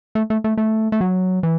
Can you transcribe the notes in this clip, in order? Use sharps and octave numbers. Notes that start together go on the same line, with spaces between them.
A3
A3
A3
A3
A3
F#3
E3